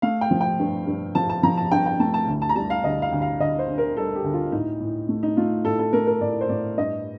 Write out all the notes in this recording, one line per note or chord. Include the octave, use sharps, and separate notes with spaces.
A3 F5
G5
F3
G5
G2
G2
F3 A5
A5
F3 A#5
A5
G2 G5
G5
A3 A5
A5
D2
A5
A#5
G3 A5
F5
D2 D#5
F5
D2
F5
D2 D#5
C5
D3
A#4
G3 A4
G4
D2
F4
A2 D#4
A2
A3
D#4
A3 F4
A2 A4
A4
A3 A#4
A#4
A2 D5
C5
A2 D5
G2 D#5